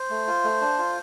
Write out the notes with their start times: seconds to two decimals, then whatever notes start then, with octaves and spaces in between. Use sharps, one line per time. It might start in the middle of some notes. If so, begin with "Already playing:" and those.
Already playing: C5
0.10 A3
0.27 F4
0.44 A3
0.61 D4
0.78 F4